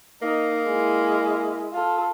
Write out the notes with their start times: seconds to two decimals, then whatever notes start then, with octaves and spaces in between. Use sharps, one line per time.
0.22 A#3 D#4
0.66 G#3 E4
1.73 F4 A4